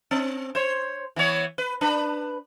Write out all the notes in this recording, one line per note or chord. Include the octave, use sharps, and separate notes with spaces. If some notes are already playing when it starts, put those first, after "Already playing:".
C4
C5 C#5
E3 B3 C#5
B4
D4 B4